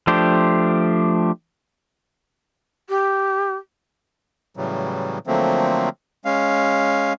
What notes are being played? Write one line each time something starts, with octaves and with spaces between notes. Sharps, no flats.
F3 A3 D4 G4 C5
G4
A2 C#3 E3 F#3 G3
D3 F3 F#3 A3 A#3 C4
G#3 C#4 F5